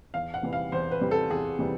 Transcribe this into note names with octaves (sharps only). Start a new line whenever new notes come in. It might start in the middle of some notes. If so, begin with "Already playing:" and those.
E2 F5
F#5
C3 E3 G3
F5
E2 C5
B4
C3 E3 G3
A4
E2 G#4
C3 E3 G3